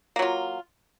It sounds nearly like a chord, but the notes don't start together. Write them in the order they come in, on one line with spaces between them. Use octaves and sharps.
A#3 F#3 F4